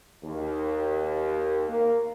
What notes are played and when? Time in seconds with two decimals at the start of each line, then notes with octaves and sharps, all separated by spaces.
0.23 D#2
1.68 A#3